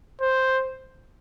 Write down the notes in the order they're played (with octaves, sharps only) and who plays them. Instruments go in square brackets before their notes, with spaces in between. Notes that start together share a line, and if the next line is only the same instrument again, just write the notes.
[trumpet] C5